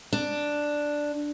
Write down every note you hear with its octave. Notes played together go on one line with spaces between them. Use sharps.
D4